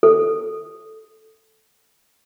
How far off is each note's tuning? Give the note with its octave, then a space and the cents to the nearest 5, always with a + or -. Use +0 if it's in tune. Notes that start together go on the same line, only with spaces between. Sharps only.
A4 -5